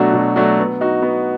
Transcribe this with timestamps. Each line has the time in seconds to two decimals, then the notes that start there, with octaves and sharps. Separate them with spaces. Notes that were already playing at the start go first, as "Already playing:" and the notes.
Already playing: B2 F#3 A3 D4 F#4
0.13 B2
0.36 F#3 A3 D4 F#4
0.58 B3
0.81 D#4 F#4
1.02 B3